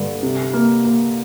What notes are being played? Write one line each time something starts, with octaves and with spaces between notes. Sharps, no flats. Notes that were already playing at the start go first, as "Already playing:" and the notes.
Already playing: G2 D3
C3
A#3
A#3